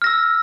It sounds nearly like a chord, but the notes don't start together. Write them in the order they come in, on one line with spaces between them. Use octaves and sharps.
F6 A#6 E6